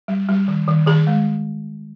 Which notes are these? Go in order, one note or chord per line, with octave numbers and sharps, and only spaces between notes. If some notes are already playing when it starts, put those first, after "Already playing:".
G3
G3
D#3
D#3
D#3 G#4
G#3